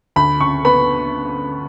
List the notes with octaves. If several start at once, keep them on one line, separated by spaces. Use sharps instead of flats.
D2 B5
C#3 C#6
B3 B5